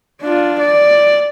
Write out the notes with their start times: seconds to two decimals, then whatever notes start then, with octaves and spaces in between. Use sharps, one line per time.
0.22 D4 F4
0.59 D5